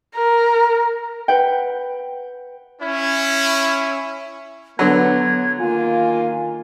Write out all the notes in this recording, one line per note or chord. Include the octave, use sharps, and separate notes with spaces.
A#4
B4 F#5 G5
C#4 E4
D3 F#3 B3 G#6
D#3 A#3 F4 G#5